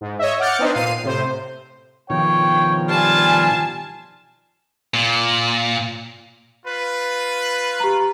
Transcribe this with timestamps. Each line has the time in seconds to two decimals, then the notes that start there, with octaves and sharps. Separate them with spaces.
0.01 G#2
0.19 C#5 D#5 E5
0.40 F#5 D6 F6 G6 A6 C#7
0.59 B3 C4 D4 D#4 B4 C5
0.74 A#2 F5 C7 D#7
1.04 A2 C3 C5
2.10 B2 D#3 F3 C#5 G5
2.89 G3 F4 G#5 A5
4.94 A#2
6.66 F4 B4
7.80 G4 A#5